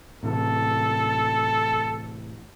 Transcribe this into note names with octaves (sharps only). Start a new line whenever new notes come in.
A2 C3 E3 A4